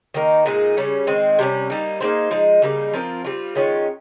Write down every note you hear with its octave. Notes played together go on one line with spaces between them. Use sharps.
D#3 A#3 D#4 A#4
A#2 G#3 D#4 G#4
C#3 G3 C#4
D#3 G#3 C4
C3 G3 C#4
G3 A#3 D#4
A#3 D#4 G#4 C5
F3 G#3 D#4
C#3 G3 A#3 D#4
F3 C4 F4 A#4
G3 C4 F4
D#3 G#3 C#4 F4